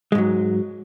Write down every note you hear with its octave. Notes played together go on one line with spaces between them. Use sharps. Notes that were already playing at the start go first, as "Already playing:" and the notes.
G#2 F#3 G#3